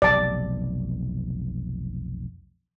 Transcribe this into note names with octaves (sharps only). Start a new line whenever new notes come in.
F1 B1 D5 A5